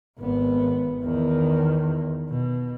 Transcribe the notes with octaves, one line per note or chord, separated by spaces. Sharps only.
G#1 B3
E2 D#3
B2